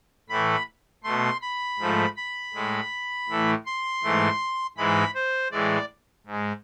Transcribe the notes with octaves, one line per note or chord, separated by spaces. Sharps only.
A2 E3 A3 B5
B2 A3 C6
B5
G#2 F3 A3
B5
A2 G#3
A2 E3 A3
C6
G#2 E3 A3
G#2 E3 G#3 B5
C5
A2 E3 G#3 D5
G#2 G#3